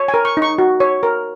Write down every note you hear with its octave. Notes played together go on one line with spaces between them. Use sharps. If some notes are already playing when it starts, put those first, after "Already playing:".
Already playing: C#5
G#5
A#4
C#6
D#4
C#6
F#4
C#5
A#4